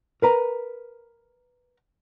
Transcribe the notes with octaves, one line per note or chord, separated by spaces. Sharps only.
A#4 B4 A#5